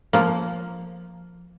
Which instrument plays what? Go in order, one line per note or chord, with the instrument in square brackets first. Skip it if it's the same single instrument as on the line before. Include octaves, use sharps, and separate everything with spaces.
[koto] F3 A#3